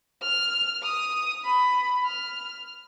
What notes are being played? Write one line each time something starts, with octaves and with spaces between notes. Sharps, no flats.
F6
D#6
B5
F6